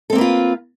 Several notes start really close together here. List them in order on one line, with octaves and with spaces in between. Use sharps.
A4 C4 A#3 B4 F4